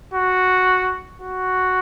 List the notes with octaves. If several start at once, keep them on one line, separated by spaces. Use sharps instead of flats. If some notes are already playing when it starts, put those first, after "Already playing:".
F#4
F#4